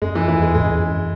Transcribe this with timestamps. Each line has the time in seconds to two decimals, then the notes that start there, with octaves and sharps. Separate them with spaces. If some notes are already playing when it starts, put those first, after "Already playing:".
0.02 F#2 G#3
0.15 E3
0.28 E2 E3
0.42 G#3
0.54 G#2 G#3
0.62 F#2
0.70 E2
0.77 F#2